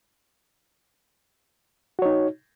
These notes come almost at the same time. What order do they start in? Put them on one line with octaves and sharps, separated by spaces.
F#4 C#5 D#4